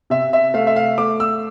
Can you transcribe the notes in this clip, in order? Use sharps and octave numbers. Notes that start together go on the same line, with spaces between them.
C3 E5
E5
A3 F5
E5
F5
A3 D6
E6